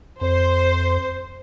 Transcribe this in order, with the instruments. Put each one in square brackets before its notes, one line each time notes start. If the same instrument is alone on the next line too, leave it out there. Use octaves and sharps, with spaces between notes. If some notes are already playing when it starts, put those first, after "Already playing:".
[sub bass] F2 [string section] C5